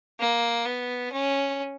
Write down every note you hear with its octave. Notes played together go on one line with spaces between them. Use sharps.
A#3
B3
C#4